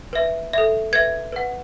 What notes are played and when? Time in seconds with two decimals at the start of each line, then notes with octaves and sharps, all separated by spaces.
0.13 B4 E5
0.53 A4 E5
0.93 B4 E5 G#6
1.32 B4 F#5